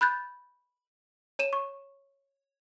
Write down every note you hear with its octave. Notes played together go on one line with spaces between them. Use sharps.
B5 F#6 G6 A6
C#5 D#7 E7
C#6